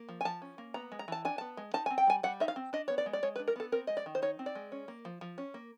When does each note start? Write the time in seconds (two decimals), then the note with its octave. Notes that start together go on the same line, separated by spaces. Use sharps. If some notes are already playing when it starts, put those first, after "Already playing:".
Already playing: A#3
0.09 F3
0.21 G#5
0.25 F3 A5
0.42 C#4
0.58 A#3
0.74 B3 A#5
0.92 G#3
0.99 A#5
1.08 E3 A5
1.25 D4 G#5
1.38 B3 A5
1.57 G#3
1.74 D#4 A5
1.86 C4 G#5
1.98 G5
2.07 G3 G#5
2.23 G3 F#5
2.40 D#4 E5
2.48 F5
2.56 C4
2.73 D4 D#5
2.88 B3 C#5
2.98 D5
3.06 G#3
3.13 D5
3.23 G#3 C#5
3.36 B4
3.39 D4
3.48 A#4
3.56 B3 A4
3.72 C4 A#4
3.87 G#3 D#5
3.97 D5
4.06 D#3
4.15 C5
4.22 D#4 C#5
4.39 C4
4.46 D5
4.55 G#3
4.72 C#4
4.88 A#3
5.05 F3
5.21 F3
5.38 C#4
5.54 A#3